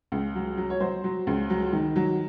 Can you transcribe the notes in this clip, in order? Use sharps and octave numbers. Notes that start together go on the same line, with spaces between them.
C#2
F#3
F#3
C#5
F#3 C5
F#3
C#2
F#3
D#3
F#3